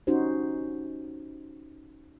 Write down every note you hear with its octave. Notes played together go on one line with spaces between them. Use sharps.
C#4 D#4 F#4 G4 C5